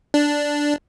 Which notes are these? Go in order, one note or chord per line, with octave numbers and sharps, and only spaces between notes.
D4